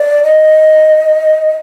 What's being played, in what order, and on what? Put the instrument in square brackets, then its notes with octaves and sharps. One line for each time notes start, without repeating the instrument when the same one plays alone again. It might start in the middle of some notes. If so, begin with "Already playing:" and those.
Already playing: [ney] D5
D#5